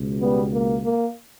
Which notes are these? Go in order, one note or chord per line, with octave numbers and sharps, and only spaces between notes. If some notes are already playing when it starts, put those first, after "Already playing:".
Already playing: C#2 B2
G3 B3
A#3
A#3